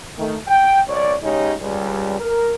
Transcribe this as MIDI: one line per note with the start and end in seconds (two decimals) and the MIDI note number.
0.18 0.36 51
0.18 0.36 57
0.47 0.81 79
0.88 1.14 36
0.88 1.14 73
0.88 1.14 74
1.23 1.53 49
1.23 1.53 56
1.23 1.53 63
1.23 1.53 67
1.23 1.53 73
1.61 2.19 37
1.61 2.19 55
2.20 2.52 70